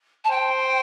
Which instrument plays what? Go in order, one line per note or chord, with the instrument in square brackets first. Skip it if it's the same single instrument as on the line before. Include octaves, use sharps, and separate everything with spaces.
[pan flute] A5
[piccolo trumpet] C5 [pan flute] G5